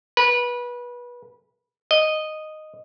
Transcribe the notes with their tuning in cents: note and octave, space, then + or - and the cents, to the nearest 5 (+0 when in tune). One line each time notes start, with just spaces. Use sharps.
B4 -25
D#5 -5